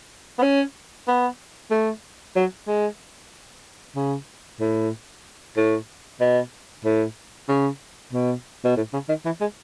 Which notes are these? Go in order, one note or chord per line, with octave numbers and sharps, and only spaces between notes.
B3
C#4
B3
A3
F#3
G#3
C#3
A2
A2
B2
A2
C#3
B2
B2
A2
C#3
D#3
E3
G#3